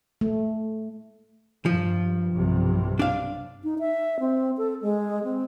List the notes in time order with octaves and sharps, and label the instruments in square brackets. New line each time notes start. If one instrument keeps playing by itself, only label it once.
[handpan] A3
[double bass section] G2 [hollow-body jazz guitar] F3
[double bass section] B1 G2 C3
[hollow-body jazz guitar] D4 F5
[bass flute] D#4
E5
C4
A4
G#3
C4